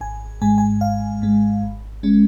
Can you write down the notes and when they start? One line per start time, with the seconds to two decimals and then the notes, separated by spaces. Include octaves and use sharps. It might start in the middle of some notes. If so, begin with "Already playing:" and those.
0.01 G#1 G#5
0.42 G#2 G#3 G#5
0.58 G#5
0.81 G#1 F5
1.22 G#2 G#3
1.62 G#1
2.03 G#3 C#4